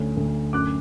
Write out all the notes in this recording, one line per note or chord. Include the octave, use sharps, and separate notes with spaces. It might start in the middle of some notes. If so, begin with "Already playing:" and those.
Already playing: D2 C#4
D2
F#2 D6 F#6